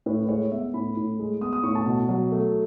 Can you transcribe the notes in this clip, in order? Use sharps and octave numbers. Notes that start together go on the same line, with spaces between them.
A2 B4
G#3 C#5
B3 E5
A2 B5
A2
G#3
B3 D#6
D#6
A2 C#6
A5
B2
F#3
A3